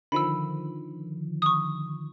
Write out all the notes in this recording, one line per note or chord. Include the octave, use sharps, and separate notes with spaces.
D3 D#3 F3 B5 E6
C#6 D#6